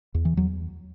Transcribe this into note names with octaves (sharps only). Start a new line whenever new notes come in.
E2
E3
E2 F#3